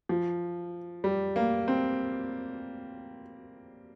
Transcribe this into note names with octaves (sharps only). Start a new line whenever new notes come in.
F3
G3
A#3
C4